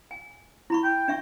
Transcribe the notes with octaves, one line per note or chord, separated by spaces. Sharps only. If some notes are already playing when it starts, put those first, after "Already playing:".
G#5
E4 B5 C#6
G5
D4 E5 C#6